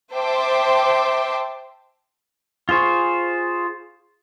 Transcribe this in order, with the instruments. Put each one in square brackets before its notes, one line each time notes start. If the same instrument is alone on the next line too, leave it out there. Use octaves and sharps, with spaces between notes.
[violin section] C5 E5 G5 A5 C6 D6
[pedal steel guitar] F4 G#4 C5 C#6